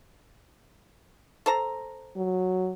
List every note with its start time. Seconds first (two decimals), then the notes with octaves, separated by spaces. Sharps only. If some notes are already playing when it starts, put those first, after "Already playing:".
1.46 A4 C5 A#5
2.17 F#3